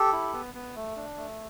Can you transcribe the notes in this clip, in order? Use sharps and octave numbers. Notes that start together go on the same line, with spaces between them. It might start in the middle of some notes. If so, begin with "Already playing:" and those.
Already playing: G4 A4
E4
B3
B3
A3
D4
A3